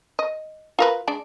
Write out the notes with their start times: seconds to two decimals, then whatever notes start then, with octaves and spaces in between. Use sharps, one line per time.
0.19 D#5
0.79 F4 A#4 B4
1.08 G#3 D4 D5